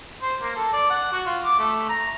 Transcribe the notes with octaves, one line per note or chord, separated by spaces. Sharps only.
C5
A#3
A4
D5
F#5
F#4
F4
D6
A3
A#5